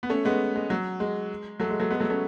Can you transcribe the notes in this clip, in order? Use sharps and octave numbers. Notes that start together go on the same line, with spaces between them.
B3
A3 C#4
G#3 B3
G#3
F#3
G#3
F#3 A3
G#3
F#3 A3
G#3 B3
F#3 A3
A3 C#4